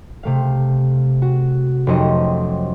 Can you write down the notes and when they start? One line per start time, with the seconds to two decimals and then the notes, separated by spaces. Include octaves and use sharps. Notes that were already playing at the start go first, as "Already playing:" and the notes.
0.23 C3 A3 F5
1.22 F#4
1.87 F1 F#3 C4 C#4 A4 D#5